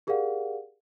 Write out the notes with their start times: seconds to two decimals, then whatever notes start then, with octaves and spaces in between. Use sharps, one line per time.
0.07 G4 G#4 A#4 D5 F5 F#5